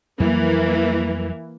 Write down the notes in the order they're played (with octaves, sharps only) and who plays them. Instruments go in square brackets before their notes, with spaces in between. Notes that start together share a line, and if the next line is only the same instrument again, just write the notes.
[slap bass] F2 F#3 G3 [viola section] E3 A#3